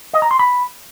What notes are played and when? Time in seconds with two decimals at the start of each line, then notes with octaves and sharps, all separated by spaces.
0.13 D#5
0.22 A#5
0.31 C6
0.39 B5